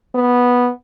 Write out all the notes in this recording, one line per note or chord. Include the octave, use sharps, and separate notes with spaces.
B3